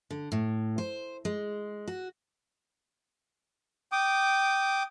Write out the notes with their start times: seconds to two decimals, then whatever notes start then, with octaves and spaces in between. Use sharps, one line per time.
0.11 D3
0.32 A2
0.78 C5
1.25 G#3
1.88 F#4
3.92 G5 D6 D#6